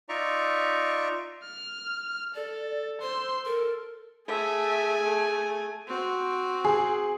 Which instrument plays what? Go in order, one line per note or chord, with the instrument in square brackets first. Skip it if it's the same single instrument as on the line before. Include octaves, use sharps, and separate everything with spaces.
[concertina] D#4 F4 D5 E5 A#5 C#6
[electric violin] F6
[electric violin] A4 [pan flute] D5
[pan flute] C5 [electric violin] C6 E6
[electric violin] A4 [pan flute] A#4
[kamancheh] A3 E5 [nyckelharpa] G#4 G#5
[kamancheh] A3
[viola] C4 F#4
[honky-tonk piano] G#4